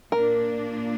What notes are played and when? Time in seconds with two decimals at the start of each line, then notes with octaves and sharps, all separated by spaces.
0.12 A#2 A#3 D4 A#4